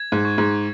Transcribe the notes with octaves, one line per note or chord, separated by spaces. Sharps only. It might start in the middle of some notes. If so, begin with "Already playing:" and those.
Already playing: G#6
G#2
C#6
G#2